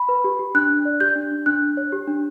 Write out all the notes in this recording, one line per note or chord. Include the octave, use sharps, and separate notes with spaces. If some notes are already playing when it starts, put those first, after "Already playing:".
Already playing: B5
B4
G4
G4
D4 F#6
D4
D5
G4 G6
D4
D4
D4 F#6
D4
C#5
G4
D4